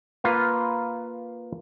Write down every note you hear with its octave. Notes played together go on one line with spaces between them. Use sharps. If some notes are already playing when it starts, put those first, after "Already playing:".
A#3 F4 B4 F5